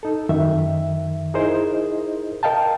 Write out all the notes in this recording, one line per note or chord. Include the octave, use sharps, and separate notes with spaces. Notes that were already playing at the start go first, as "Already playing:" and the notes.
D#4 A4
F#2 D#3 E5
D#4 E4 G#4 A#4 C5 D#5
A#4 D#5 F5 G5 A5